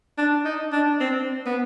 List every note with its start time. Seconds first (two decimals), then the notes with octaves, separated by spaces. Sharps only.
0.18 D4
0.45 D#4
0.73 D4
1.00 C4
1.46 B3